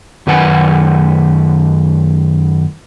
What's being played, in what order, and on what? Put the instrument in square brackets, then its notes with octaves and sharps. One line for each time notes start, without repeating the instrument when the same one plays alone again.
[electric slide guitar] F#2 D#3 B4 F#5 G#5